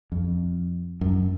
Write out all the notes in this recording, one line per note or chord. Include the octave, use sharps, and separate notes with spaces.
F2
F#2